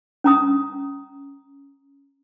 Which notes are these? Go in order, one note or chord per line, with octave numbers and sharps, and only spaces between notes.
C#4 A#5 D#6